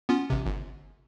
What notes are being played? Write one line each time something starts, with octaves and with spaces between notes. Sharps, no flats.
B3 C#4 F4
A1 C3
G1